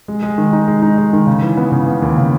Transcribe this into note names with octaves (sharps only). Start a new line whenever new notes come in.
G#3
G#3
D#3
D#4
G#3
D#4
G#3
D#3
C#3
E3
B3
C#3
B3
D#2
C#3